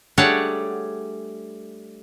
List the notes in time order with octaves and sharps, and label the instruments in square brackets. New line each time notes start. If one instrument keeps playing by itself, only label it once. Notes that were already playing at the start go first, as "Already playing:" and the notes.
[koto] G3 A3 D4 G#4 C#5 F#5